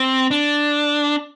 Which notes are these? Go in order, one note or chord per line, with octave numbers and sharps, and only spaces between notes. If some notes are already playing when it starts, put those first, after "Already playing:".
Already playing: C4
D4